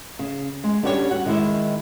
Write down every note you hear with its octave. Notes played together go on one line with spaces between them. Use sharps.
C#3
G#3
G3 C#4 D4 F#4 G4 C#5
F#5
D#3 G#3 E4